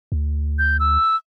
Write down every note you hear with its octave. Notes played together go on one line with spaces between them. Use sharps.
D2
G6
E6